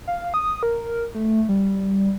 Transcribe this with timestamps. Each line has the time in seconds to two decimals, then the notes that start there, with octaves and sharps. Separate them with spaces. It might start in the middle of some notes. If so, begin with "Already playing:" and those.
0.07 F5
0.34 D#6
0.63 A#4
1.15 A3
1.49 G3